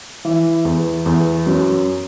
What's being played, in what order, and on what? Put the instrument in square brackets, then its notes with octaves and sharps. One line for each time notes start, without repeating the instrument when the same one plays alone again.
[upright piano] E3
E2
E2
F#2